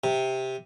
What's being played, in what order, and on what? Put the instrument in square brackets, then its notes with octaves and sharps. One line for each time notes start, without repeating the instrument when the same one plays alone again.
[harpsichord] C3